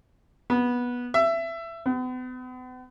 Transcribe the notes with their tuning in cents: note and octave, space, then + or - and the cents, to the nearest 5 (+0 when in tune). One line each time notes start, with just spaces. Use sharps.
B3 -15
E5 +20
B3 +40